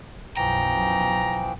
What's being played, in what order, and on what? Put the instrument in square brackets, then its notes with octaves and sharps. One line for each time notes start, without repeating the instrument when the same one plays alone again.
[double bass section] B1 F#2 [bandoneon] E3 F3 [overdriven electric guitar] G5 [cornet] A#5